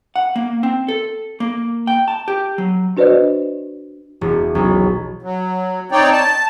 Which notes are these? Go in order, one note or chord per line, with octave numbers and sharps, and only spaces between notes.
F#5
A#3
C4
A4
A#3
G5
A5
G4
F#3
D4 F#4 B4 C5 D5 D#5
E1
B1
F#3
C4 D#4 C#5 D5 G5
A5